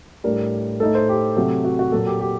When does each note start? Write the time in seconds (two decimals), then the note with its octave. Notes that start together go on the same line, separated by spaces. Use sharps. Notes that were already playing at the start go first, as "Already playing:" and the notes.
0.24 A2 G3 D4 A#4
0.80 A2 A3 D#4 A4
0.95 C5
1.09 G4
1.36 C3 F#3 A3
1.64 F#4
1.79 F#4
1.92 A#2 F#3 A#3 A4
2.06 G4
2.21 G4